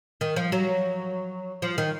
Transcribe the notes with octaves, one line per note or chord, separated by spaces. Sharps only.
D#3
F3
F#3
F3
D#3